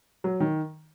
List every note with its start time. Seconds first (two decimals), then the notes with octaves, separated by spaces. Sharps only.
0.24 F#3
0.40 D#3